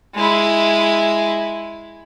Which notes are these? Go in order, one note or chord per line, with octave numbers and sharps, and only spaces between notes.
G#3 E4